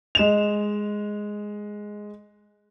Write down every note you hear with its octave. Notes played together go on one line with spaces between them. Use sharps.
G#3 E7 F7